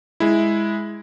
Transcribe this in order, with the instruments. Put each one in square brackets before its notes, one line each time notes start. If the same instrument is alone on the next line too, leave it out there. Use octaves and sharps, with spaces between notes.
[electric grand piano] G#3 E4